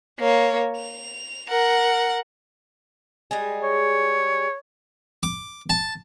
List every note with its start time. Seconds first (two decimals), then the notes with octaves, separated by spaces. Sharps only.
0.19 A#3 C#5
0.77 F7
1.48 A#4 F#5
3.31 G3 G#3 G#4
3.63 C#5
5.23 D6
5.70 A5